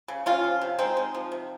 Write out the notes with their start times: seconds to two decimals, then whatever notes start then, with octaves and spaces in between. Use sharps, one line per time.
0.08 C#3
0.26 C3 C#4 F4
0.44 F3
0.61 C3
0.79 G#3 C4 D#4
0.97 G#3
1.15 F3
1.32 C3